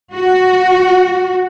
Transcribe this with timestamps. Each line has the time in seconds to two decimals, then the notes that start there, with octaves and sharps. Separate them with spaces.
0.13 F#4